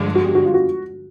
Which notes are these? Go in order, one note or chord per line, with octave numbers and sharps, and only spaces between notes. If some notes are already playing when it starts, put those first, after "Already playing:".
Already playing: G2 D3 F3 G#3
F#4
G4
F#4
F4
F#4